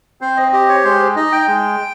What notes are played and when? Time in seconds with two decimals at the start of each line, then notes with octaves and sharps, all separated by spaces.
0.21 C4 C5
0.37 D#5
0.52 G4 D#5
0.69 C#5
0.84 G#3 C5
1.16 D#4 D#5
1.32 G5
1.48 G#3